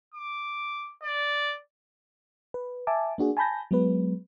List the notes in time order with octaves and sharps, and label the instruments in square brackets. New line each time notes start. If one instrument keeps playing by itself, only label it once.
[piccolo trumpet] D6
D5
[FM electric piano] B4
E5 G#5 A5 D6
A#3 D4 F#4 G#4
G#5 A5 B5 G6 A#6
F#3 G#3 B3 B4